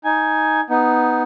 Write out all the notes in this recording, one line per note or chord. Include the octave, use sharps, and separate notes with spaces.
D#4 G#5
B3 D#4